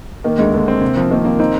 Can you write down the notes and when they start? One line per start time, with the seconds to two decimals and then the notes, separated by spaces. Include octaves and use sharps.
0.24 D#3 A#3
0.39 D2 G#3
0.53 D3 A#3
0.68 C4
0.81 C3
0.97 F3
1.11 D#3 A#3
1.25 A#3 C4
1.39 C4 D#4